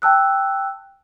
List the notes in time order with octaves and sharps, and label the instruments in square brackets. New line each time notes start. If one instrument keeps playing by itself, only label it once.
[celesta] G5 A5 E6 F#6